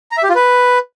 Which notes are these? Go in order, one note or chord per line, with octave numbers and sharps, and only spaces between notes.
A#5
E5
G4
F4
B4